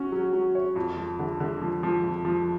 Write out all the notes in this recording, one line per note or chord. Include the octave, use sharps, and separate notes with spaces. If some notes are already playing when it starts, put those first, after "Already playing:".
Already playing: C#4 F#4 C#5
F#3
F#3
C#5
F2
F3
D3
D3
F3
F3
F2
F3